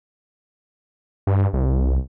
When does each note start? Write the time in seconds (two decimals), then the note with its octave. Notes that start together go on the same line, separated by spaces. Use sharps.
1.27 G2
1.53 C2